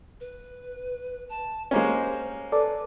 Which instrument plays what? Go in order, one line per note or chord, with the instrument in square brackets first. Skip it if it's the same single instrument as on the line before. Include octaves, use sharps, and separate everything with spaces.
[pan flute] B4
A5
[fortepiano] G#3 A#3 C#4 [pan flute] C5
[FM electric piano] A4 D5 [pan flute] B4